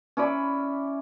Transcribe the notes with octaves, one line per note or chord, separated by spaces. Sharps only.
C#4 E4 D5 B5